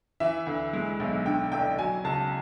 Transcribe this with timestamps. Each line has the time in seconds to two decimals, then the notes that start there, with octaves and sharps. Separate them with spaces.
0.20 E3 E5
0.47 D2
0.73 G#3
1.00 B1
1.25 D3 G5
1.52 F1 G5
1.78 F#3 G#5
2.04 C#2 A5